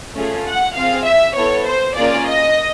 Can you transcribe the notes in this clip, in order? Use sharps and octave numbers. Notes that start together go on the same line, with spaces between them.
A3 C#4 F4 G#4
F#5
C4 F4 G#4 F5
E5
B3 E4 A4 C#5
C5
A#3 C#4 F4 G#4 D5
D#5